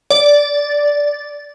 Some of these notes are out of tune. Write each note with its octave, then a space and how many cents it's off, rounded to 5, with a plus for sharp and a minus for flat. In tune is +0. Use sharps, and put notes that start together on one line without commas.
D5 -10